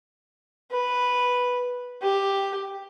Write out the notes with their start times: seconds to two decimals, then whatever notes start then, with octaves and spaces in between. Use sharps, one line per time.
0.72 B4
2.02 G4